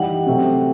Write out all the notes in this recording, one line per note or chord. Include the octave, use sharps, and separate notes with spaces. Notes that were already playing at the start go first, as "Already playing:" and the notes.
Already playing: E3 G3 D#4 F#5 G5
C3 F#3 A3 C4 F#4